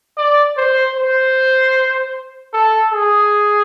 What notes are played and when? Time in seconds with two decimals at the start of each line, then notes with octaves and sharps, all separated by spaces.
0.17 D5
0.57 C5
0.96 C5
2.53 A4
2.92 G#4